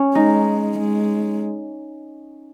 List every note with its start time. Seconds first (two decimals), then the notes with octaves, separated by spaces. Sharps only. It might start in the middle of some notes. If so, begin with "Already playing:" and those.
Already playing: C#4
0.15 G#3 D#4
0.78 G#3